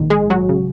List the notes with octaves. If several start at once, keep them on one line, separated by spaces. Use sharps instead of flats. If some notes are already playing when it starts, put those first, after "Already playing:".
Already playing: A#1 G#2 D#3
G#3 G#4
F#3 F#4
C#3